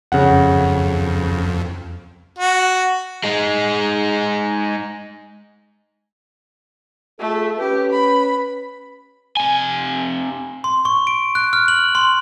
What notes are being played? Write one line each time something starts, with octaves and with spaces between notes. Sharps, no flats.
F2 C#3 F#5
F#4
G#3 D#4
A3 F4 G#4 A4
C#4 G4 B4
B5
C3 G#5
C6
C#6
D7
F#6
F6
F#7
C6